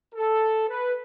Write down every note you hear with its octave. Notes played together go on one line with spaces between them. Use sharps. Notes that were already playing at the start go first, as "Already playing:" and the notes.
A4
B4